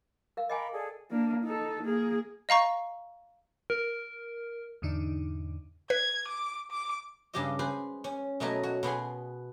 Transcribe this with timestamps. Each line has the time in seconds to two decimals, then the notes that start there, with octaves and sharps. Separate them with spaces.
0.37 A#4 F5
0.49 A#4 D#5 G5 G#5 B5 D6
0.72 G#4 A4 D5
1.11 A#3 D4
1.44 D#4 A4
1.83 A#3 G#4
2.49 D#5 F5 A#5 C#6
3.70 A#4
4.82 E2 G#2 D3 D4 D#4
5.90 B4 G#6
6.28 D6
6.71 D6
7.33 G2 C#3 G#3 G4 C#5 D#5
7.59 G#4 B4 C5
8.04 C#4
8.40 B2 F#3 A3 A#4 C#5 D#5
8.63 F#4 C#5
8.83 B2 B3 G#4 C6